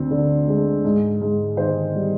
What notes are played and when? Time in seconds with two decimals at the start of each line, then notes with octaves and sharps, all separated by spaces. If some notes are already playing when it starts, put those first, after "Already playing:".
Already playing: D2 C4
0.11 D3
0.47 G#3
0.85 G#2
1.21 G#2
1.57 D#3 C5
1.95 G3